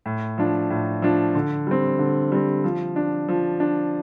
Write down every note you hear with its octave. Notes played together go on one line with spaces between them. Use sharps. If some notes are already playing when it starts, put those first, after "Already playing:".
A2
F3 D4
A2
F3 D4
D3
G3 C4
D3
G3 C4
F3
D4
F3
D4